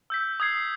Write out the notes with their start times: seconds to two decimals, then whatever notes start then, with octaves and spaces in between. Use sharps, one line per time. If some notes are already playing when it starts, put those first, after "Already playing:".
0.10 E6 G6 B6
0.40 D#6 G#6 C7